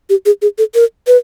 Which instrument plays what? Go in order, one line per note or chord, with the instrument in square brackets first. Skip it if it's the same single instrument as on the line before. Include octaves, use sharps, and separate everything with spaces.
[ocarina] G4
G#4
G#4
A4
A#4
B4